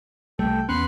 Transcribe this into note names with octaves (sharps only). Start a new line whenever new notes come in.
C2 G3 A3 A4 G5
E2 B3 C#4 B4 C6 F#6